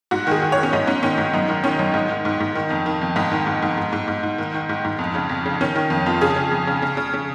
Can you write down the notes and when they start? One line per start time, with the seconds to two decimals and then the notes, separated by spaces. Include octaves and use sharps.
0.11 G#2 F#4
0.27 D#3 G#4
0.42 D#3
0.52 C#5
0.57 D#3
0.63 C#4
0.73 G#2 D#4
0.87 G#2 C#4
1.03 D#3 C#4
1.18 G#2
1.34 F#2 D#4
1.48 D#3
1.64 D#3 C#4
1.79 F#2
1.94 G#2 D#4
2.09 D#3
2.25 G#2
2.40 G#2
2.55 D#3
2.70 F2
2.86 D#3
3.01 F2
3.16 G#2 D#4
3.32 D#3
3.47 G#2
3.62 G#2
3.77 G#2
3.93 G#2
4.08 G#2
4.23 G#2
4.38 D#3
4.54 D#3
4.69 G#2
4.85 G#2
4.99 F2
5.15 C#3
5.29 F2
5.46 C#3
5.61 D#3 C#4
5.76 D#3
5.90 F2
6.06 F2 F4
6.21 C#3 G#4
6.36 C#3
6.51 F2
6.67 C#3
6.82 C#3
6.97 C#3
7.13 C#3